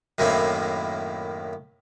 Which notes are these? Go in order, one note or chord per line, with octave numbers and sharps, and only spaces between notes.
F#2 A2 D#3 A#3 C4 E4